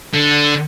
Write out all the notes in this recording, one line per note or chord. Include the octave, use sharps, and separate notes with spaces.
D3